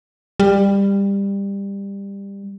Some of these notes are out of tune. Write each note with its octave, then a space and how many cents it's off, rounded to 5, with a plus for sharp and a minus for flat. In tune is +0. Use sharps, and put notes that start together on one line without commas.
G3 +20